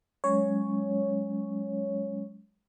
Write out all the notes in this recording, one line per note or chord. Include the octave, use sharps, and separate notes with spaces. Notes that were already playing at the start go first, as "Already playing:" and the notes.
F#3 G#3 C#4 C#5